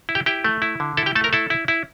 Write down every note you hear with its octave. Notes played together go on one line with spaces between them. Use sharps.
E4
G4 G5
E4 G4 G5
A3
E4
D3
E4 A4 A5
G4 G5
A3 A4 A5
A#4 A#5
E4 A4 A5
E4
E4